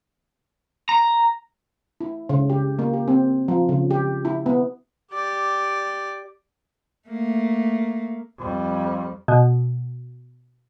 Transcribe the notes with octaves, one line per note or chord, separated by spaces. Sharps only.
A#5
E4
C#3
G4
A#3
G4
C4
F3
C#3
G4
E4
B3
G4 D5
A3 A#3
F2 G3
B2